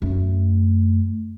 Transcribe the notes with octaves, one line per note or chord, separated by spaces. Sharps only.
F#2 A3